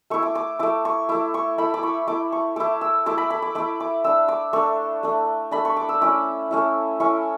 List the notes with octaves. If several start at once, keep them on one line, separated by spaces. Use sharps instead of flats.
A3 E4 C#6
D6
D6
A3 E4 D6
C#6
A3 E4 D6
C#6
A3 E4 B5
D6
C#6
A3 E4 D6
C#6
A3 E4 D6
E6
A3 E4 D6
B5
B5
D6
A3 E4 D6
D6
A3 D4 E6
D6
A3 D4 C#6
A3 D4
A3 D4 B5
C#6
D6
E6
A3 C#4 E4 D6
A3 C#4 E4
A3 C#4 E4 C#6